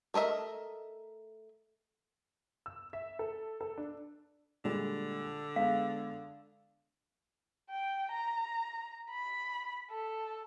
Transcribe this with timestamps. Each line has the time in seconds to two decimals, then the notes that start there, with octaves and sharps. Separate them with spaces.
0.14 A3 A#4 D#5 E5
2.66 E6
2.93 E5
3.19 A4
3.61 A4
3.78 D4
4.64 A#2 D3 G3 G#3
5.56 G#3 B3 F5
7.70 G5
8.11 A#5
9.10 B5
9.90 A4